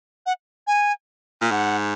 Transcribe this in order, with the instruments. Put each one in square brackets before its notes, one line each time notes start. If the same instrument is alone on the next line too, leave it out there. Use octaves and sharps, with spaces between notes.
[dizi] F#5
G#5
[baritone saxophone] A#2
[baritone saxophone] G#2 [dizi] F#5